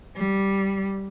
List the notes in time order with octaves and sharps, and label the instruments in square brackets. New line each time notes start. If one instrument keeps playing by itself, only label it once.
[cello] G3